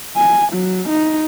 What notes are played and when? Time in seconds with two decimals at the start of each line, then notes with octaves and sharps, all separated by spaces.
0.17 G#5
0.53 F#3
0.89 D#4